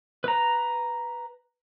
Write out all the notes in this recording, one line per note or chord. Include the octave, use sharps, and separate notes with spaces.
B4 A#5